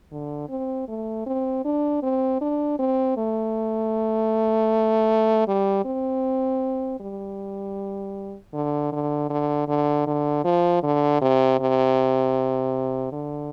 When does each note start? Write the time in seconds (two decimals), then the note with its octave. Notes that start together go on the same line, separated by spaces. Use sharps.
0.11 D3
0.49 C4
0.88 A3
1.26 C4
1.65 D4
2.03 C4
2.41 D4
2.79 C4
3.17 A3
5.47 G3
5.85 C4
7.00 G3
8.53 D3
8.92 D3
9.30 D3
9.68 D3
10.07 D3
10.44 F3
10.83 D3
11.21 C3
11.59 C3
13.12 D3